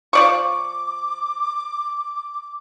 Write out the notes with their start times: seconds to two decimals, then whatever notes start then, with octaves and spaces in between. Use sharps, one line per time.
0.13 F3 D5 C#6 D6